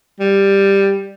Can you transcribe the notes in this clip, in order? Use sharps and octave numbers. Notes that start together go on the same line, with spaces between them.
G3